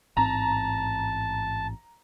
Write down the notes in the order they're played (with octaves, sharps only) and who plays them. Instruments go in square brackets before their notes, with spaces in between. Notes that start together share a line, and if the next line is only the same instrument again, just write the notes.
[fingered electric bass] A1 G#2 C4 [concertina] A5 [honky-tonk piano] A#5